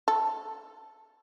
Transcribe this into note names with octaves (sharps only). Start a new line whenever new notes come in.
A4